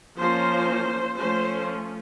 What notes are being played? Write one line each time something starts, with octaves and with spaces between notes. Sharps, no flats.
F3 A#3 C#4 C5
F3 A3 C#4 C5